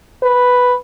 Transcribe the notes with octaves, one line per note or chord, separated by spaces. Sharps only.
B4